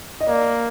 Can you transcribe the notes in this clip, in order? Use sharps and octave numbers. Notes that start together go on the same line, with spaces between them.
D#5
A#3 D5